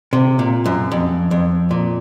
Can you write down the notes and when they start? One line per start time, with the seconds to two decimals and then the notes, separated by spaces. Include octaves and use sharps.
0.13 C3
0.39 A#2
0.66 F#2
0.92 F2
1.31 F2
1.71 A#2